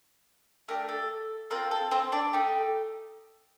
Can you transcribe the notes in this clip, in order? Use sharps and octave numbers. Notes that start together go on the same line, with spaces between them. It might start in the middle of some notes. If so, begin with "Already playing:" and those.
A3 D4 G4 A#4
A4
C4 F4 A4 A#4
A4
C4 C5
D4 D5
A3 D#4 G4